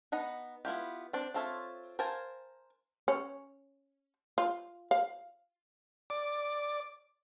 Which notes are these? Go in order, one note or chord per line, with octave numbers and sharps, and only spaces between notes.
B3 D#4 F#5 A#5
B3 E4 F4 G4
C4 D4
C4 F4 A4 C#5 E5
A#4 C5 F5 G#5 A5
C#4
F4
F5
D5